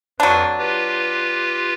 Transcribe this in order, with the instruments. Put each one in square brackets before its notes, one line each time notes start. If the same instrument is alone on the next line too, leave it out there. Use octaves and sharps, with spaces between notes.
[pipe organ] F2 B4 [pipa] F#3 D4
[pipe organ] F4 G4 B4